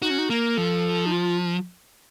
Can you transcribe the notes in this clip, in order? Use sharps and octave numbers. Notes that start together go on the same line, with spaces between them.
D#4 F#4
C#4
D#4
A#3 A#4
F3 A4
D#4
F4